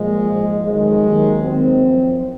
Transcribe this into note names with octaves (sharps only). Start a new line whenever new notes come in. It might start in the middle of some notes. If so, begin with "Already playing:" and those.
Already playing: A#2 F3 G#3
G#2 F3
F2 D#3 F#3 G#3
D#2 D#3 F#3
D#2 D#3 F#3 C4
F#2 F3